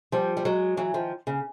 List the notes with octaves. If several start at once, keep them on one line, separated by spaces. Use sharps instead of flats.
F3 G3
G3
F#3 G#3
E3 F#3
D#3 F3
C#3